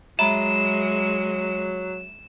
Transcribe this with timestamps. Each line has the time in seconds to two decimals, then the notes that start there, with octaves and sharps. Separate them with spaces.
0.19 F#3 G#3 E5 A#5 B5 E7